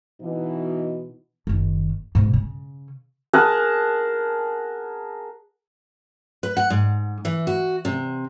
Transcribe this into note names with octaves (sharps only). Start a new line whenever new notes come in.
B2 E3 D#4
F#1 D#3
G#2 B2
C#3
G#4 A#4 F#5 A5
B4
F#5
G#2
E3
F#4
C3